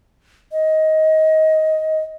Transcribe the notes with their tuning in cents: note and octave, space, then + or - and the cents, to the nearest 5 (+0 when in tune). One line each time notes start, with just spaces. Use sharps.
D#5 +15